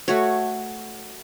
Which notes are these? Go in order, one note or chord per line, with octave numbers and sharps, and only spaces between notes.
A3 F#4 C#5